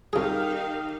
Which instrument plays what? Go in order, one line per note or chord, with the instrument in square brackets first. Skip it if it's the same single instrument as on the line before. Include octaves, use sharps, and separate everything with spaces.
[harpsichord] C2 G#4 [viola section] D#3 D#4 F5 [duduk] G4